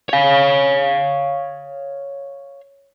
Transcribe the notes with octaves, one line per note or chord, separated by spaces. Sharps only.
C#5 F5